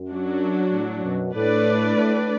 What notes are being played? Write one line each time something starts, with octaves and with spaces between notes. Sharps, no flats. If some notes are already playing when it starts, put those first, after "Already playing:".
Already playing: F#2
F#3 D4 F#4
A2
F#2 B2
A2 A3 D4 B4 D5
A2